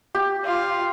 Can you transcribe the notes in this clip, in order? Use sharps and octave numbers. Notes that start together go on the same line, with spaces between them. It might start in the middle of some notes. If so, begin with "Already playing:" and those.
G4
F4